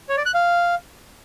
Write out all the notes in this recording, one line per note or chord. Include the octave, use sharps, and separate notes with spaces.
C#5
D5
F#6
F5